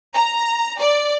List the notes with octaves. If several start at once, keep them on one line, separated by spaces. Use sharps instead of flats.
A#5
D5